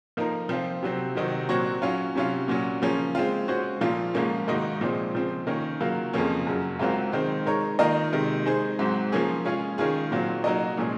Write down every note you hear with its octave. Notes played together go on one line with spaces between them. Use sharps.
F3 A#3 D#4 A#4
F3 C4 F4
C3 F#3 C4
C3 D#3 F#3 C4 D#4
A#2 F#3 C4 F#4 C#5
F#3 C#4 F4
C3 F#3 C#4 F4
A#2 F#3 C#4
C#3 F3 A#3 C#4
G#3 C4 F4
G#3 C#4 F#4 C5
A#2 F3 A#3 F4
G#2 F3 A#3 C#4
G#2 D#3 A#3 D#4 F#4
A#2 F3 G#3 C4
C#3 F3 C4
D#3 A#3 C#4
C#3 F#3 A#3 F4
F2 C#3 F3 A#3 C#4
F#2 C#3 F#3
G#2 F#3 C4 F4 A#4
D#3 G#3 C4
G#3 D#4 A#4 C#5
D#3 A#3 F4 A#4 D#5
C3 D#3 G#3
G#3 D#4 G#4 C5
G#2 F#3 C4
F3 A#3 C#4 G#4
G#3 C#4 F4 G#4
D#3 G#3 C#4 F4 G#4
A#2 F#3 C4 F4
F#3 A#3 D#4 A#4 D#5
A#2 F3 G#3 C#4 G#4